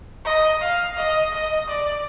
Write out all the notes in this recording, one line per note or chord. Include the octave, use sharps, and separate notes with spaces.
D#5
F5
D#5
D#5
D5